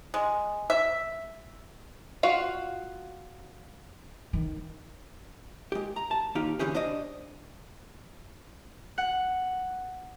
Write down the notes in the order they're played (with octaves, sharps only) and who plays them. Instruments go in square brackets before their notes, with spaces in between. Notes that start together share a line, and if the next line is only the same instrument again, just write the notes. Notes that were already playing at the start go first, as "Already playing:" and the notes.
[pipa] G#3
E5
[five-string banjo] F4 F#4 F5
[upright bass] D#3
[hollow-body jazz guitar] G#3 G4
A#5
A5
D#2 D#4 F4 G4 F5
D3 E3 C#4 G4 G#4
D4 C5 D5 D#5
[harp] F#5